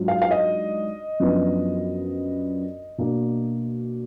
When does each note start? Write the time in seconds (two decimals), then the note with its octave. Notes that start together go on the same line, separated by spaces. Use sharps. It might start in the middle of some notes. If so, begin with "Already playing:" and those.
Already playing: G#2 F#3 D4 F4
0.08 F5
0.22 F5
0.31 D#5
1.20 F#2 F3 B3 D4
2.98 B2 A#3 D4